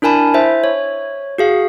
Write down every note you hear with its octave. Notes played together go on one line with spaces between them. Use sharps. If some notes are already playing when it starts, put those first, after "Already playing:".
D4 E4 A#4 G#5 A5 B5
E4 C5 E5
C#5
F#4 G#4 F5